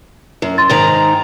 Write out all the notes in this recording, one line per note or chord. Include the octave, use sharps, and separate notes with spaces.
F#2
C6 A6
G#2 D#3 A#5